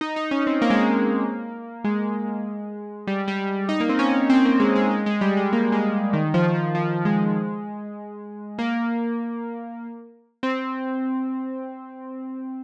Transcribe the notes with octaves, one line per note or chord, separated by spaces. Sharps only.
D#4
D#4
C#4
C4
A#3
G#3
A#3
G#3
G3
G3
D#4
A#3
C4
C#4
C4
A#3
G#3
G#3
G#3
G#3
G3
G#3
A#3
G#3
D#3
F3
F3
F3
G#3
A#3
C4